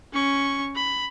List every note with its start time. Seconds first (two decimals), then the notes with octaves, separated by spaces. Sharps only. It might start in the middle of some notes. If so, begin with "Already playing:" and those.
0.13 C#4 C#6
0.76 B5